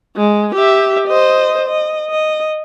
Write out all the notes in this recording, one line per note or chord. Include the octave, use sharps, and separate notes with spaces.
G#3
G4 E5
C5 D#5
D#5
D#5